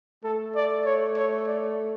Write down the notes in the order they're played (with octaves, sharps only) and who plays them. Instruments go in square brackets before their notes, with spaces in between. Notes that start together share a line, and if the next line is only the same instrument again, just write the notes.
[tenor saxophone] A3 [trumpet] A4
[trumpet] D5
C#5
C#5
D5